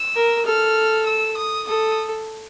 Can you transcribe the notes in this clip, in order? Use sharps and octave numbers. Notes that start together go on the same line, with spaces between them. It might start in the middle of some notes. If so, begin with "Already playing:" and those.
Already playing: E6
A#4
A4 F6
E6
D#6
A4 D#6